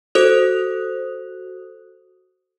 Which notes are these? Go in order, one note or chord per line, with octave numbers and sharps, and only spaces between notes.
F#4 A4 C5 D#6 F#6 F7